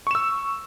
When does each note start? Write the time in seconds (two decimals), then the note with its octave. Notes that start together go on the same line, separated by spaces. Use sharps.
0.07 C#6
0.11 E7
0.15 E6